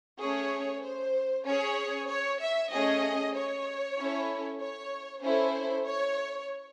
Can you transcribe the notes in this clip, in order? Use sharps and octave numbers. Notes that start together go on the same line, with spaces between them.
A3 C#4 G#4 C#5
C5
C#4 G#4 C#5
C#5
E5
A3 C#4 G#4 D#5
C#5
C#4 E4 A4
C#5
C#4 E4 A4 C5
C#5